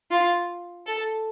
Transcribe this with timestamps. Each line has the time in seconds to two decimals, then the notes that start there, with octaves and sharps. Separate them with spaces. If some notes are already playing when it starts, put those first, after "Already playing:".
0.11 F4
0.87 A4